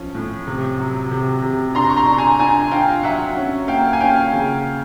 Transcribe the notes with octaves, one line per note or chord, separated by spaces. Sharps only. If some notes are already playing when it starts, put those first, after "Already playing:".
Already playing: F3 C#4
A2
C3
F#3
C3
C3
D4 A#5 C6
C#6
A#5 C6
D4
G#5 A#5
D4 G#5 A#5
D4 F5 G5
F#3 E5 F#5
C#4
A#3 F5 G5
G#5
C#4 F5 G5
C#3